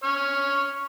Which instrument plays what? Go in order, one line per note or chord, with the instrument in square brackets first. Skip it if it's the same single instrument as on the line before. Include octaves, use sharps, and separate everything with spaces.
[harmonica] C#5 F6